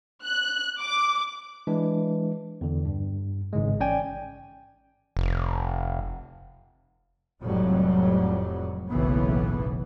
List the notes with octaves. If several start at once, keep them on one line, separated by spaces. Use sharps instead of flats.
F#6
D6
E3 G#3 D4
E2 D3
G2
G#1 G#2 C#3 G#3
A1 C#4 D5 G5 G#5
F1
F1 F2 A2 F#3 G3
F#1 B1 A2 C#3 E3 B3